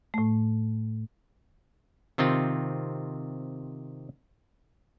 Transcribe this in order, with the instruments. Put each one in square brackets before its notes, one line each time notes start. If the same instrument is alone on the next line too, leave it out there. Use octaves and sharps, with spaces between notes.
[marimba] A2 A3
[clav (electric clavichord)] C3 D#3 C4 F4